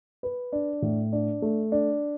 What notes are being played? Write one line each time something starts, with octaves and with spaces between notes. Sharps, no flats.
B4
D4
A2
D4
A3
D4